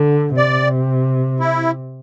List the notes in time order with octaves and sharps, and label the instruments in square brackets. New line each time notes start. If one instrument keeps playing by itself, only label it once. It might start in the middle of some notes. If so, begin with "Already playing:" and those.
Already playing: [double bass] D3
[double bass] C3 [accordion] D5
[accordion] E4